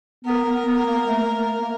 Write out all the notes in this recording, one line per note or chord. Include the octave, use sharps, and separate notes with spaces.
B3 A#4
B3
B3
A#3
A3
A3
A#3